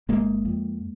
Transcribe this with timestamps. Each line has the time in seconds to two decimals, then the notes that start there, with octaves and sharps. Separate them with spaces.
0.09 G1 G#3 A#3
0.45 F2